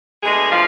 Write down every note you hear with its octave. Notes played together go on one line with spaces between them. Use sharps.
B2 G#3 A3 D4 G#4
F3 F4